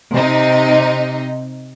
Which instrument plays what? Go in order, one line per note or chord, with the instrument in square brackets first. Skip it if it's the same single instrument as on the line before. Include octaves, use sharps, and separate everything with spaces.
[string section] C3 D#4